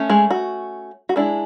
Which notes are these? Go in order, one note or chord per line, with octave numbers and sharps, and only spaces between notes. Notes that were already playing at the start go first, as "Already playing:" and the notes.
Already playing: A3 C#4
G#3 G#4
F#4
F#4
G#3 D4 E4